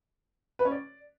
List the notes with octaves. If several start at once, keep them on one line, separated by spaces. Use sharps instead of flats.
B4
C#4
D5